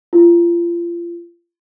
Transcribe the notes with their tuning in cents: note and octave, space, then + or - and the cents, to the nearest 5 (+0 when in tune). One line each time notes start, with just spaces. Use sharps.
F4 -30